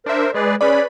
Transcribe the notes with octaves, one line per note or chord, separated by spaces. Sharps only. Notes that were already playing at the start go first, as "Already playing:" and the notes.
D4 A#4 C5 E5
G#3 G#4 B4 D5
C#4 G#4 B4 D5 B5